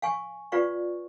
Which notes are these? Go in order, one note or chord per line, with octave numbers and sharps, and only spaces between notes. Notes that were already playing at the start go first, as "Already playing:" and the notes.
F5 G#5 C#6
F4 B4 D5 F5 C#6